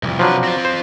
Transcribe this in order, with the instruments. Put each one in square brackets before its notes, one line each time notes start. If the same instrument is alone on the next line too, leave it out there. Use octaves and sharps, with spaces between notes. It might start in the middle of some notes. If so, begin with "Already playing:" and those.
[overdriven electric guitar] C2 F2
[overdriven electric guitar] C3 B4 [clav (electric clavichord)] F3 F#3 D4
[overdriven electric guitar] C4 F4
[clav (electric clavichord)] C5